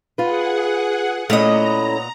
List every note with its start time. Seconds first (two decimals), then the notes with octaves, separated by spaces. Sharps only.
0.18 F4 G#4 B4 F#5
1.30 A#2 A3 B3 C#4 E4 D#5 A#5